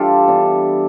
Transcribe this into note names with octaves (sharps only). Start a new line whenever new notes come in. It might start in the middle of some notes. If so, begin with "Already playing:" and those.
Already playing: E3 G3 D4 F4 G4 A4
E3 B3 D4